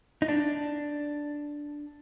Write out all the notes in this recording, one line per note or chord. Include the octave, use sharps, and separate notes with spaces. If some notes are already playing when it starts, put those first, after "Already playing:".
D#4
D4